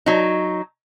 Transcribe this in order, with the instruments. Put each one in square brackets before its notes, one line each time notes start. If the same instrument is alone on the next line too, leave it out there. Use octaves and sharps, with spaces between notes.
[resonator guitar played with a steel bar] F#3 D#4